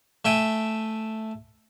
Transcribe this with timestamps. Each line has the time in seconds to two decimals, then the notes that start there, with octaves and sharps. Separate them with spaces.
0.25 A3 E5 G5 G#5